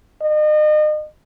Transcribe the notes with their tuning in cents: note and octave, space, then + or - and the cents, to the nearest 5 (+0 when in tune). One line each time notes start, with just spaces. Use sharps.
D#5 -35